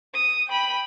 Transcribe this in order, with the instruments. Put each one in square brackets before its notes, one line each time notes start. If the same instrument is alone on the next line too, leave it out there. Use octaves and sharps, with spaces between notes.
[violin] D#6
G5 B5